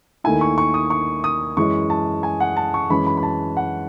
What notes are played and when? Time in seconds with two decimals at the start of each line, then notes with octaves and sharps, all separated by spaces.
0.24 D#2 D#3 A3 E4 G#5
0.41 C#6
0.58 C#6
0.74 D#6
0.90 C#6
1.24 D#6
1.57 F#2 E3 G#3 C#4 E4 C#6
1.90 A5
2.23 G#5
2.40 F#5
2.57 A5
2.74 C#6
2.90 F#2 E3 G#3 C#4 B5
3.06 B5
3.17 B5
3.23 A5
3.57 F#5